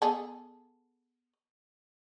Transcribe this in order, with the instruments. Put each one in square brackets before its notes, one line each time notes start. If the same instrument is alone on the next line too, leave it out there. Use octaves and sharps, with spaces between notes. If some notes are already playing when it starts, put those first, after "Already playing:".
[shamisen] B3 G#4 A4